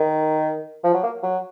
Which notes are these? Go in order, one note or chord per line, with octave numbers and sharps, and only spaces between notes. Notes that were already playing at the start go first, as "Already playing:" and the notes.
Already playing: D#3
F3
F#3
A#3
F#3